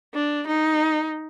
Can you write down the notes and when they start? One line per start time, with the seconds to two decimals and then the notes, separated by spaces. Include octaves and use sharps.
0.14 D4
0.47 D#4